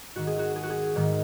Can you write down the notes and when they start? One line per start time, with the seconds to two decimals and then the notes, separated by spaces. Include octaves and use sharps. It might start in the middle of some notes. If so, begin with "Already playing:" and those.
0.15 G#2 D#3 F#4
0.27 G#4
0.39 F#4
0.56 G#4
0.63 F#4
0.70 G#4
0.96 G#2 D#3